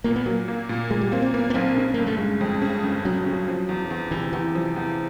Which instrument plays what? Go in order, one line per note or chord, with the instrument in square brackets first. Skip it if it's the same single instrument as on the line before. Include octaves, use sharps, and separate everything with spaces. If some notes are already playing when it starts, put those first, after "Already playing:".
[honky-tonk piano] A#2 [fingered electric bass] A#3
[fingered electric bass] B3
[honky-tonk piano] F#3 [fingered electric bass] A#3
[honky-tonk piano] A#3
A#2
[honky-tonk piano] A#2 [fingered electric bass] G#3
[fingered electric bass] G3
[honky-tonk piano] A#3 [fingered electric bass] C4
[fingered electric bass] C4
[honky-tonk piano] A#3 [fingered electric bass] B3
[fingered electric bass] B3
[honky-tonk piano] B1 [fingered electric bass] C4
[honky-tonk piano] C#3
[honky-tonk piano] G1 [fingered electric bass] A#3
[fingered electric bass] A3
[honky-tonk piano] G1 [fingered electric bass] G#3
[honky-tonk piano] F2
C#3
G1
[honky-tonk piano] C#3 [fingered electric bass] F#3
[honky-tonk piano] C#3
F3
E2
E2
[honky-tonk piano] C3 [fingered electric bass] E3
[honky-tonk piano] E2 [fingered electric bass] E3
[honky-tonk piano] F3
E2